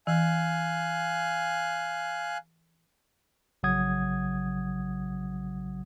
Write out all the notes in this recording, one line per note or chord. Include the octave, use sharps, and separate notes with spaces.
E3 F5 G#5 F#6
A#1 C#3 F#3 F#5 D#6 G#6